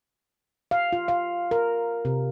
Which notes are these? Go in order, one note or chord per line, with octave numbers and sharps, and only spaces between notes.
F5
F4
F5
A#4
C3